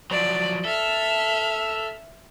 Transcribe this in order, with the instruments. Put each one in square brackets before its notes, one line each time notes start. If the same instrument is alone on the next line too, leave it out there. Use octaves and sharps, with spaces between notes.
[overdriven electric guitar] F3 F#3 [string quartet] D5
[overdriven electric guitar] A4 [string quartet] E5 F6